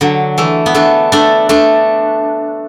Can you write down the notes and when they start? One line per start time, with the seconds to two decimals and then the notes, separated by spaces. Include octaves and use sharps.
0.01 D3 F#3
0.38 E3 A3
0.66 B3
0.74 A3 D4
1.12 A3 D4
1.49 A3 D4